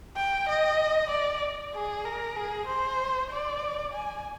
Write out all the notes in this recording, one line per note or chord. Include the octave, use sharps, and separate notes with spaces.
G5
D#5
D5
G#4
A#4
G#4
C5
D5
G#5